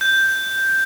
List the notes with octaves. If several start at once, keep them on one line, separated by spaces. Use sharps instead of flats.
G6